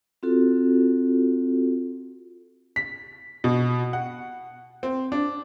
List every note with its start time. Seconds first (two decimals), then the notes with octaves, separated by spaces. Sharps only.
0.23 C4 F4 F#4 A4
2.76 B6
3.44 B2
3.93 F#5
4.83 C4
5.12 D4